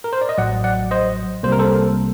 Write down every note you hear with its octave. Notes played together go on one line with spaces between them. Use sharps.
A#4
C5
D5
D#5
A1 A2 F#3 D5 F#5
D5 F#5
C5 D#5
C2 C3 G3 A#3 C5
A#4
A4 C5